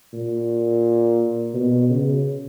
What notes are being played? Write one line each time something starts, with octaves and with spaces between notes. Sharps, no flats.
A#2
B2
C#3